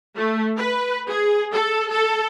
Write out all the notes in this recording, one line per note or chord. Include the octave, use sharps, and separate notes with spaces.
A3
B4
G#4
A4
A4